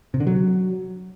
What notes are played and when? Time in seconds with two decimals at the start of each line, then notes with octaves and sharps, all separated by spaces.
0.14 C3
0.20 D3
0.27 F#3